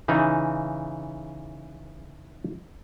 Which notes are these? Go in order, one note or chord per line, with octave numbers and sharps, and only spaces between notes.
C#3 E3 D#4